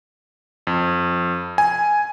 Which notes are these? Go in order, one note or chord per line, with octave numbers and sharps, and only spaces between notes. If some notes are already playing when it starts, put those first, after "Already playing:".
F2
G#5